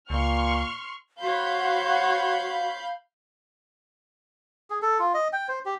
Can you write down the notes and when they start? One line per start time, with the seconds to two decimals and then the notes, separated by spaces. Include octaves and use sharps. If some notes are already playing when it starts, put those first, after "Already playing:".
0.10 C#2 A#2 C6 C#6 F6
1.21 F#4 C5 C#5 F5 B5 G6
4.70 G#4
4.82 A4
5.00 F4
5.14 D#5
5.33 G5
5.49 C5
5.65 G4